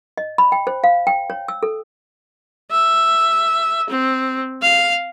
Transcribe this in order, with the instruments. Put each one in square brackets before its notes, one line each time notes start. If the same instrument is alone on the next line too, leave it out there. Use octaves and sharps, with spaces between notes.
[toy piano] D#5
B5
G5
C5
F5
G5
C#5
E6
A4
[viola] E5
C4
F5